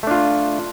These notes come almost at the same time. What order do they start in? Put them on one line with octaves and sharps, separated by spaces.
A3 D4 F4